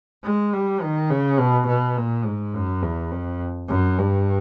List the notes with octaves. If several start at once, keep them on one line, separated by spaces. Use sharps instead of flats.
G#3
G3
D#3
C#3
B2
B2
A#2
G#2
F#2
E2
F2
F#2
G2